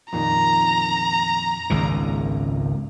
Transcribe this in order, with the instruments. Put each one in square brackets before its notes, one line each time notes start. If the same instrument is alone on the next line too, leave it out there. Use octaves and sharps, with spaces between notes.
[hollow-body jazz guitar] F2 A#2 D#3 [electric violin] A#5
[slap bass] G#1 C#2 A#2 [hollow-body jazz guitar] C#3